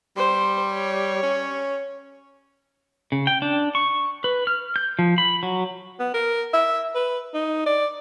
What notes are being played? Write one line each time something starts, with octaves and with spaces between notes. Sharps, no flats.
G3 C5
C#5
C#4
C#3
G5
D4
C#6
B4
F6
G6
F3
B5
F#3
B3
A#4
E5
B4
D#4
D5